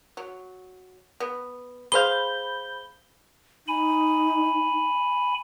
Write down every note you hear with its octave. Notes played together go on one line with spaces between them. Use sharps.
F#3
B3
G#4 C5 F5 B5 G6 G7
D#4 G#5 B5